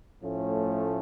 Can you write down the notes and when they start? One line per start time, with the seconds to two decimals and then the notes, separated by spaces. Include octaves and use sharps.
0.22 A2 F3 A3 C#4